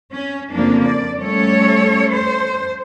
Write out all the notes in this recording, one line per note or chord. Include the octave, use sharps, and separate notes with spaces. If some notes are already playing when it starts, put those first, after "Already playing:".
C#4
F2 C#3 F3 A#3 D4
D5
G3 A3 C#4 A4 C#5
C5